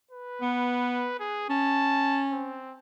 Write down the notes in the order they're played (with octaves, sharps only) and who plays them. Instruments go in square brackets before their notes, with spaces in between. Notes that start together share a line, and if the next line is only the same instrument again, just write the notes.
[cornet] B4
[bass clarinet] B3
[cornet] G#4
[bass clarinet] C#4 [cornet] A5
[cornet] C4